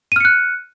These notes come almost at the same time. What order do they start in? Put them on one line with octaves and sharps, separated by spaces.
D#7 F6 C#7 F#6